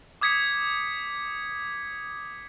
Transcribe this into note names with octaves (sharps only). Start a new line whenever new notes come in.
D6 D#6 G#6 B6 C#7